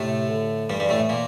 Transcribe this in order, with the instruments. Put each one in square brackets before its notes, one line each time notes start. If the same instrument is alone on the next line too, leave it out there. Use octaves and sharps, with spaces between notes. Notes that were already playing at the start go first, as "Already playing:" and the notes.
Already playing: [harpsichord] A2 A3 [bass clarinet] C3
[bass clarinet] D3
[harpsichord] G2 G3 [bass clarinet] E3
[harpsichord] G2 G3
A2 A3
A#2 A#3